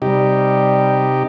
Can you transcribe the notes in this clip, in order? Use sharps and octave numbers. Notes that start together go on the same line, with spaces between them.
C3 G3 D#4 G4